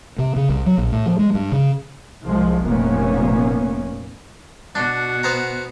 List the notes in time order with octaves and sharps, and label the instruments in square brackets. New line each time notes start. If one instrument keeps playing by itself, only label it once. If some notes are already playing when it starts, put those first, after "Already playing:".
[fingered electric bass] C3
C#3
C2
F#3
A#1
A2
F3
G#3
G2
C#3
[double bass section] C2 F3 G#3
F1 A#2 A#3 B3 C#4
[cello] B2 [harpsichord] D4 [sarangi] F#4
[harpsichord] B3 C5 A#5